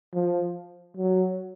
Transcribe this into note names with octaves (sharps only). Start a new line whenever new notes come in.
F3
F#3